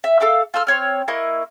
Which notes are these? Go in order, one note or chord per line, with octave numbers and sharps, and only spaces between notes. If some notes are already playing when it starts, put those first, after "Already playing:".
E5
A4 F5 D6 E6
F4 A4 E6 F6
C4 C#5 F6
A#3 E4 D#5 C#6